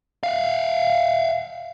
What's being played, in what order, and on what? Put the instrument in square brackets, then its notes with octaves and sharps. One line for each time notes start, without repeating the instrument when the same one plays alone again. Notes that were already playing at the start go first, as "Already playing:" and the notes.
[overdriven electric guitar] E5 F5